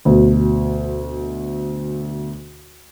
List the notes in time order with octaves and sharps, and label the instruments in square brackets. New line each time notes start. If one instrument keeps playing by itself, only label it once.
[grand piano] D2 B2